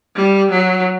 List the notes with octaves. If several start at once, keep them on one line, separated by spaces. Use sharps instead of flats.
G3
F#3